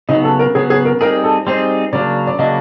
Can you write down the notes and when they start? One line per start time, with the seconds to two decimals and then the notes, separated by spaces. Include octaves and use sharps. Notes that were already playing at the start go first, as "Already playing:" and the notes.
0.09 C#3 F#3 B3 D#4
0.24 A4
0.39 A#4
0.55 C#3 F#3 B3 G#4
0.70 G#4
0.85 A#4
1.01 G3 C4 D#4 G#4 A#4
1.24 A4
1.47 G3 C4 D#4 G#4 C5
1.93 C#3 F#3 A#3 D4 D5
2.27 D5
2.39 C#3 F#3 A#3 D4 D#5